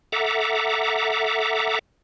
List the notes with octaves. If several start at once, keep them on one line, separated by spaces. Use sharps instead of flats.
A4 E5 F#5 A#5 D6